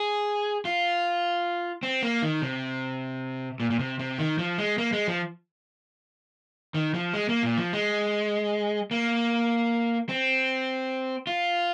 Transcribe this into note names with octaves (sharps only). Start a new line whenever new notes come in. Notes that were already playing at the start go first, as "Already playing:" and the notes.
Already playing: G#4
F4
C4
A#3
D#3
C3
A#2
A#2
C3
C3
D#3
F3
G#3
A#3
G#3
F3
D#3
F3
G#3
A#3
A#2
F3
G#3
A#3
C4
F4